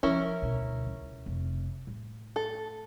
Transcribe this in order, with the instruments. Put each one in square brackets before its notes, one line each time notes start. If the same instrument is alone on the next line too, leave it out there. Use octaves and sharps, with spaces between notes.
[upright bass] F3 [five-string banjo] C#4 E4 A#4
[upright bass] D2 B2
C#2
F1
A2
[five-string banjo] A4